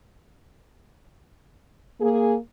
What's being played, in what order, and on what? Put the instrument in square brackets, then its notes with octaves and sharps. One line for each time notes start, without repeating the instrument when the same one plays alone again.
[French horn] A#3 [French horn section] G#4